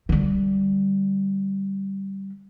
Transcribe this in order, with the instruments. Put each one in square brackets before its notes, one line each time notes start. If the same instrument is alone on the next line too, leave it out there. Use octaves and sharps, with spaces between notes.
[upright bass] D3 G3